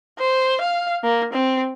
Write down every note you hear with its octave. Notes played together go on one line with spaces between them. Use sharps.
C5
F5
A#3
C4